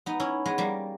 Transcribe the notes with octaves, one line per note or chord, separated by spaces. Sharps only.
B3 D#4
C#4 E4
G#3 B3
G3 A#3